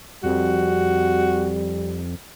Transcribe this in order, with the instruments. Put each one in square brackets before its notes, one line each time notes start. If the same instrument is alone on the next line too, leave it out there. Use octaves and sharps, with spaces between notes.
[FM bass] F2 [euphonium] G3 [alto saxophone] F#4